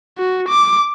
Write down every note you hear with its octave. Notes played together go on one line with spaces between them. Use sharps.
F#4
D6